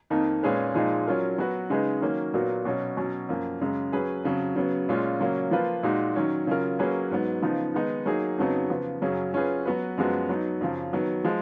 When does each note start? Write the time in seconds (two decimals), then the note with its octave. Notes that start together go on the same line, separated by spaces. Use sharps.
0.10 F2 D#3 A#3 D#4
0.43 A#2 G#3 C#4 G#4 B4
0.74 A#2 F3 G#3 D#4 G#4
1.07 F#3 C#4 F4 A#4
1.38 F#3 B3 F#4 B4
1.70 C#3 G#3 D#4 G#4 B4
2.02 D#3 F#3 A#3 C#4
2.34 A#2 F#3 B3 F#4 A#4
2.65 B2 F#3 C#4 F#4
2.97 B2 F#3 C#4
3.29 F#2 F3 A#3
3.61 F#2 C#3 G#3
3.92 F#3 C#4 G#4 B4
4.24 F2 C#3 F#3
4.56 C#3 F#3 B3
4.89 A#2 G#3 C#4 F4
5.20 C#3 F#3 A#3 C#4
5.51 F3 A#3 F4 B4
5.83 A#2 G#3 D#4 F#4
6.16 D#3 F#3 C#4
6.47 C#3 F#3 C#4 F4 A#4
6.79 F#3 A#3 C#4 G#4 B4
7.11 G#2 F#3 B3
7.42 C#3 F3 B3 D#4
7.74 D#3 G#3 B3 D#4
8.06 F#3 A#3 D#4 G#4
8.38 F2 C#3 F#3 B3 D#4
8.70 C#3 F3 B3
9.02 F#2 C#3 F#3 C#4 G#4
9.34 F#3 C#4 F4 G#4 B4
9.65 F#3 B3 F#4 B4
9.98 F#2 F3 G#3 B3 F#4
10.29 F#3 B3 D#4
10.61 F#2 C#3 F3
10.93 D#3 F#3 B3
11.25 F3 G#3